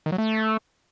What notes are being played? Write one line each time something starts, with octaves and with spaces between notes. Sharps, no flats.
D#3
F#3
A3